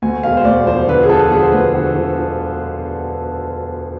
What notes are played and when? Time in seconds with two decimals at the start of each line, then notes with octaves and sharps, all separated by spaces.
0.02 D2 G#5
0.23 E1 F5
0.37 C5
0.45 D2 D5
0.67 F3 C5
0.88 D3 B4
1.03 G#4
1.09 F3 A4
1.32 D3 G#4
1.42 C5
1.52 D2 B4
1.74 D3
1.95 D3